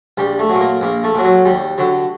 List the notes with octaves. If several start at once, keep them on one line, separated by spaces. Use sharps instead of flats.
A#1 G3
A3
A#2 F#3
A#3
A#1 A#3
A3
A#2 F#3
F#3
D#2 G3
D3 F#3